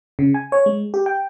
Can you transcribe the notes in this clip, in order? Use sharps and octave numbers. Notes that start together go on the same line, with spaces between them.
C#3
G#5
C#5
G#3
G4
G5